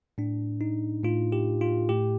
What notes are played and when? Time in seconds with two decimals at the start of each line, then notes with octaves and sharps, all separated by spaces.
0.18 A2 D4
0.61 D#4
1.04 A2 F4
1.32 G4
1.61 F4
1.89 A2 G4